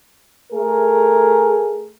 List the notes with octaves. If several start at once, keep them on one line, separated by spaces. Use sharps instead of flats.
A3 G#4 A#4